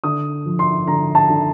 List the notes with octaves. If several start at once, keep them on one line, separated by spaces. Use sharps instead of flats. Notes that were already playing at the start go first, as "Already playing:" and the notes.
D3 D#6
F3
C6
D3 A#5
A5
D3